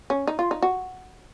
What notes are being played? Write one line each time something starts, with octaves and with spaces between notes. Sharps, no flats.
C#4
D#4
F4
D#4
F#4